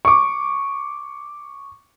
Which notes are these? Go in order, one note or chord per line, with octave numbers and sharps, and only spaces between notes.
C#6 D6